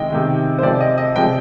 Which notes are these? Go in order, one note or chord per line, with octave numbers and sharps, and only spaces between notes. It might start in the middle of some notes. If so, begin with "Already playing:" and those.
Already playing: C3 D#3 G#3 D#5 G5
C3 D#3 G#3
C5
C3 F3 G#3 D5
D#5
D#5
C3 F3 G#3 G5